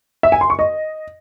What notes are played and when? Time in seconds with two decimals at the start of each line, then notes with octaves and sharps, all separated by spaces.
0.23 E5
0.32 G#5
0.41 C6
0.50 C#6
0.59 D#5